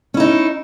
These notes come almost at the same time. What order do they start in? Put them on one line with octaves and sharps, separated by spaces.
C#4 E4 D#4